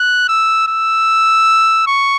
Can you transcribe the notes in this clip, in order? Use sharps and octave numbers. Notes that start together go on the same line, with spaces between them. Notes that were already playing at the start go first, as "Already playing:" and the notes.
Already playing: F#6
E6
E6
C#6